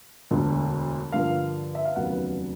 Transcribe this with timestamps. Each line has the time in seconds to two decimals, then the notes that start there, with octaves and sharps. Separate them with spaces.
0.31 E1 D2 D3
1.12 G2 D3 F3 A#3 F5
1.75 E5
1.85 F5
1.96 F1 D#2 C#3 F#3 B3 F#5